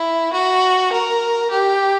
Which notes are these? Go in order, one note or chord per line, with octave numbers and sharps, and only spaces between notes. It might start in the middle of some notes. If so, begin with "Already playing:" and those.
Already playing: E4
F#4
A#4
G4